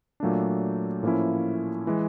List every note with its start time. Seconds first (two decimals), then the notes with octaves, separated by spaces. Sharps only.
0.20 A#2 F#3 A3 D4
1.03 A2 F3 A#3 C#4 E4
1.87 E3 G#3